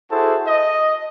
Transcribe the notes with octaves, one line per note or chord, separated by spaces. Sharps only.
E4 F#4 G#4 A4 C5 A5
D#5